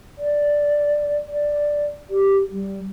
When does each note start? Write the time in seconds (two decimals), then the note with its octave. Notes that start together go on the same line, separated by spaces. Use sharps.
0.18 D5
1.29 D5
2.10 G4
2.51 G3